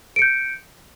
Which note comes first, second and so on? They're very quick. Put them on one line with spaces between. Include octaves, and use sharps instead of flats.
D7 C#7 G6